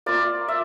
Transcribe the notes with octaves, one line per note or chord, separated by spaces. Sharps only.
A#3 F4 D5
E5